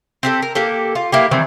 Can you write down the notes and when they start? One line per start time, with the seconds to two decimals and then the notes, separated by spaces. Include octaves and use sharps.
0.23 C4 G4 A4
0.42 A#4
0.55 A#3 G4 A4
0.95 F4
1.12 A#3 E4 G4
1.31 D#3 E3 G3 C4